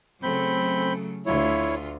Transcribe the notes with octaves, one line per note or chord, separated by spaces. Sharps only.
C#3 F#3 A3 C4 B5 G6
D2 E4 F4 C#5